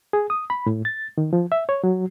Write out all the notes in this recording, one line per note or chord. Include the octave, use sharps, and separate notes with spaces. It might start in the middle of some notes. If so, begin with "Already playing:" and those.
G#4
D#6
B5
A2
A6
D#3
F3
E5
C#5
F#3